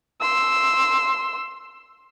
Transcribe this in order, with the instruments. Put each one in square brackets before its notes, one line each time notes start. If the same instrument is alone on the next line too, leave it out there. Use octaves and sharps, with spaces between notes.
[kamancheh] C6 E6